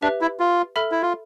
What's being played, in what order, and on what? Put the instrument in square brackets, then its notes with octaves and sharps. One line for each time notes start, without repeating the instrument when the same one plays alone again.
[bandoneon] D4 [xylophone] G4 B4 E5
[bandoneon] E4
F4
[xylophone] A4 E5 B5 F6
[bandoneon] E4
F4